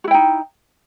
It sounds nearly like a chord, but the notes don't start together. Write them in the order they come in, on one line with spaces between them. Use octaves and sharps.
F#4 E4 G5 D#4